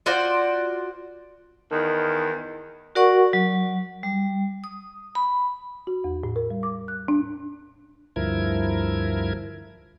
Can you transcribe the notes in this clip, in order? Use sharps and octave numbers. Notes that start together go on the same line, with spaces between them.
F4 F#4 C5 D5
E2 D#3
F#4 A#4 D5 F#5 C#6
F#3
G3
D#6
B5
F#4
E2
A2
A#4
G3
D6
F#6
D4
D2 G2 F3 E4 A#4 G#6